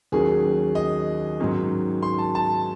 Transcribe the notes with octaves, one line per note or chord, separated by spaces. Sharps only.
D#2 D#3 F#3 C#4 G#4
D#5
G#2 D#3 F#3 C#4
C6
A5
A5